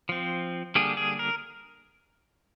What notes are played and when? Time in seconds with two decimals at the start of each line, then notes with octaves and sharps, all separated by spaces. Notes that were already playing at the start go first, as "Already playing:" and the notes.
0.09 F3 C4
0.75 D3 G3 A#3 D4 G#4
0.97 G#4
1.19 A#4